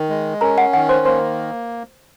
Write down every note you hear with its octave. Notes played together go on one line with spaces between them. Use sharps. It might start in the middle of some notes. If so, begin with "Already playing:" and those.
Already playing: D#3
G#3
C#4 A#4 A#5
F#5
D#3 F#5
C5 C6
A#3 C5 C6